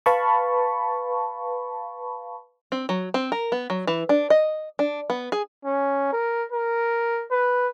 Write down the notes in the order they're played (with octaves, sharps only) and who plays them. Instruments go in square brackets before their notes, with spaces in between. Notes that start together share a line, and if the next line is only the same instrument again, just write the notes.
[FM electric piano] B4 F5 A5 B5 C#6
[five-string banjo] C4
F#3
C4
A#4
B3
F#3
E3
D4
D#5
D4
B3
G#4
[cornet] C#4
A#4
A#4
B4